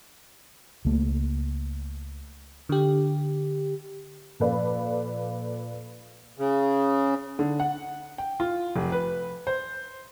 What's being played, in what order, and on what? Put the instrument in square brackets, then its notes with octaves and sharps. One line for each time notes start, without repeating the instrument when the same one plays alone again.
[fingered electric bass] C#2 A3 A#3
[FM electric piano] D3 G4
[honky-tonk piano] A#2 F3 A4 B4 D5 F5
[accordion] C#3
[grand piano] D3
F#5
G5
F4
F1
B4
C5